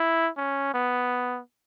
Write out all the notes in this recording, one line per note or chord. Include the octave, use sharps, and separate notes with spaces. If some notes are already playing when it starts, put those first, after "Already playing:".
Already playing: E4
C#4
B3